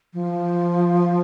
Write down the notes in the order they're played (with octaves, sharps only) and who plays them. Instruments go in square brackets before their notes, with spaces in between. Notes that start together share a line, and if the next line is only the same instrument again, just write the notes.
[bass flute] F3